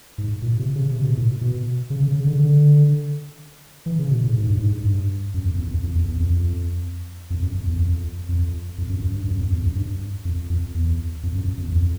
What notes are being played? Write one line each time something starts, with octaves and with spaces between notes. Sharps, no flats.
G#2
A#2
C3
C#3
C3
B2
A2
B2
C#3
C#3
C#3
D3
D3
E3
C#3
B2
A2
G#2
G2
G#2
G2
F#2
F2
E2
F2
F2
E2
E2
F2
F2
F#2
F2
E2
F2
F2
F2
F#2
F#2
G2
F#2
F2
E2
F#2
G2
F2
F2
E2
F2
F#2
F#2
E2
F2